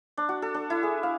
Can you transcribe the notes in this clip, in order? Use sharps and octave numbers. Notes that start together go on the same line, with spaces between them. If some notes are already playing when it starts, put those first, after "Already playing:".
D4
F#4
A4
D4
E4
G#4
F5